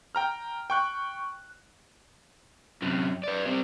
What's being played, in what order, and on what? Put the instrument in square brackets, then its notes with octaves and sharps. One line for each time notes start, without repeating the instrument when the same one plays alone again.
[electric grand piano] G5 A#5 F6
G5 C#6 F#6
[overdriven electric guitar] F#2 C3
B4 D5
G3 C4